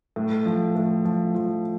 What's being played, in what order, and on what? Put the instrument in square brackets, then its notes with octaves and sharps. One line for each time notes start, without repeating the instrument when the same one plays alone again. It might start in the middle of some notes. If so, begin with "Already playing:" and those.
[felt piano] A2
F3
A2
F3
F3